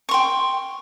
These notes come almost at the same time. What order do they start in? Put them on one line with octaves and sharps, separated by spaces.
C#6 C6 G5